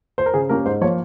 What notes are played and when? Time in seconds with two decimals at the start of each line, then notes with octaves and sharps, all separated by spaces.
0.18 C5
0.26 A#4
0.34 C#3 G#4
0.49 G3 A#3 C#4 A#4
0.65 G#2 C5
0.81 F3 C#5
0.84 A#3